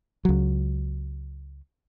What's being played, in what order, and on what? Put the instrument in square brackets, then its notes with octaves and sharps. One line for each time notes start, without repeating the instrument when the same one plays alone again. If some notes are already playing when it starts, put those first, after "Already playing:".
[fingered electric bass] C#2 F#3